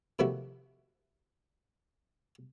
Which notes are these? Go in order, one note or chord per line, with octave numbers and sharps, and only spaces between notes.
C3 D#3 F3 A3 E4 F#4